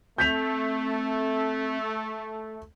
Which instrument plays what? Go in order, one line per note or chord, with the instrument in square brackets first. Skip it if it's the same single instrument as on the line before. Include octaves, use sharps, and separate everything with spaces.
[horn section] A3 [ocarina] C4 [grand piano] G6 B6 F7